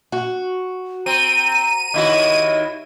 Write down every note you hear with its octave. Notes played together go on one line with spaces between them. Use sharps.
F#4
C4 A#5 D#7
A#5
D#2 E4 F#4 D#5